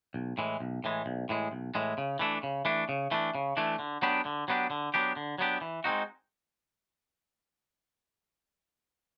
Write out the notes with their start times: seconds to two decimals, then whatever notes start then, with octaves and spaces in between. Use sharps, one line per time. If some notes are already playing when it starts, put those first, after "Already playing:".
0.14 B1
0.38 A2 E3 G#3
0.60 B1
0.84 A2 E3 G#3
1.06 B1
1.29 A2 E3 G#3
1.51 B1
1.75 A2 E3 G#3
1.98 C#3
2.19 E3 A3 D4
2.43 C#3
2.65 E3 A3 D4
2.89 C#3
3.11 E3 A3 D4
3.35 C#3
3.57 E3 A3 D4
3.79 D3
4.02 F#3 B3 D4 G4
4.25 D3
4.48 F#3 B3 D4 G4
4.71 D3
4.94 F#3 B3 D4 G4
5.16 D3
5.38 F#3 B3 D4 G4
5.61 E3
5.84 G#3 C4 D#4 F#4